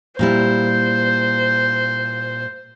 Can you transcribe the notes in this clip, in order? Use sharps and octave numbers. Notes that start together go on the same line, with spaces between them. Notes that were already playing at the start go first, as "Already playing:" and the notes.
A#2 G3 E4 C5